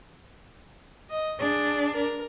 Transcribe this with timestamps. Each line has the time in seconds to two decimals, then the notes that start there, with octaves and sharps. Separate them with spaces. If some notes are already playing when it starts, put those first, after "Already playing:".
1.10 D#5
1.40 D4 G#4
1.94 A#4